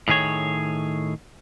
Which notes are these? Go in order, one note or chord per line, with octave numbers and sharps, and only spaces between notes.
A2 D#3 G#4 C#5